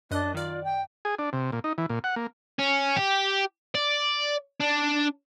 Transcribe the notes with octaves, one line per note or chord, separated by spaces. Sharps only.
F#2 D4 D#5 F#6
D#3 F4 D5
G5
G#4
D4
C3
A#2
D#4
E3
A#2
F#5
A#3
C#4
G4
D5
D4